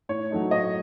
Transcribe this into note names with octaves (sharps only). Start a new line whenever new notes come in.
A2 C#5
F#3 A3 D#4
A2 D#5